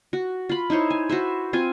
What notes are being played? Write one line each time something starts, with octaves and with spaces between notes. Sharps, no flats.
F#4
F4 B5
D#4 E4 C5 C#5
G#5
F#4 B4 C5 E5
C4 F4 G#5